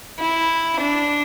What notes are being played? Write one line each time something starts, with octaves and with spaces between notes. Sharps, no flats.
E4
D4